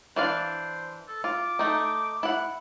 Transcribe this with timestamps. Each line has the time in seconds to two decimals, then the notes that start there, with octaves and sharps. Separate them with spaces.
0.16 E3 D4 C5 F5
1.08 A4
1.24 F4 D6
1.59 A3 D#4
2.23 E4 F#5